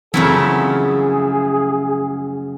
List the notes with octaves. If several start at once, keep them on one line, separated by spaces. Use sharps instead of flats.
F#2 C#3 E3 F3 A3 C4 E4 G#4